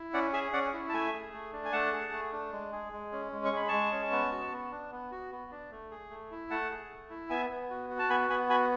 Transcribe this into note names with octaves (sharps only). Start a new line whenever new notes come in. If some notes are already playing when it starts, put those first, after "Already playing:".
Already playing: E4
C#4 D5 F#5
G#4 E5 G#5
C#4 D5 F#5
E4
A5
A3 E5 G#5
G#4
A3
D4
G#5
A3 F#5 A5
G#4
A3
D4
G#3
G#4
G#3
C#4
G#3
C#6
G#4 B5
G#3 A5 C#6
C#4
B3
F#4
B3
D4
B3
F#4
B3
D4
A3
G#4
A3
E4
A3 F#5 A5
G#4
A3
E4
B3 E5 G#5
B3
F#4
F#4
A5
B3 G#5 B5
B3 G#5 B5
F#4 G#5 B5